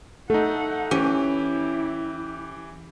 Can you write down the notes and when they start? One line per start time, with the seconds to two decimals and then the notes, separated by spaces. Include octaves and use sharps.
0.30 A3 D#4 A4 F#5
0.91 E3 C#4 E4 G4